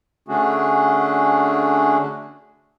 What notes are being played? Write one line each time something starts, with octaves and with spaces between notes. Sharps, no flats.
D3 A3 C#4 D4 F#4 G#4